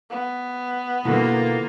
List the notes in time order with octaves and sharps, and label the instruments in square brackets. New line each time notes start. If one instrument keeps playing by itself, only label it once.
[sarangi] B3
[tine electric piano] B2 D3 [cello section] A#3 F4 [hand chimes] E4 A4 B4